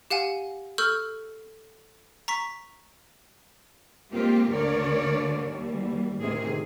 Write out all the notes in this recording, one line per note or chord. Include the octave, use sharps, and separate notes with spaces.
G4 F5 F#5 G#5
A4 C#6 E6 F6 G6
A#5 C#6 B6
G#3 A#3 C4 F4 G4
D2 D3 A#4 C#5 D5
D#2 G3
D2 A2 C3 D#3 G#4